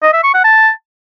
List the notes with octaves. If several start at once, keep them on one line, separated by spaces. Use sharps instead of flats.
D#5
E5
C#6
F#5
A5